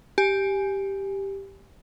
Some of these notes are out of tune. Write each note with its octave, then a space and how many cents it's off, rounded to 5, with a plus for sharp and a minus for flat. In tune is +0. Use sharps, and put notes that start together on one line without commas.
G4 +0 G#5 +0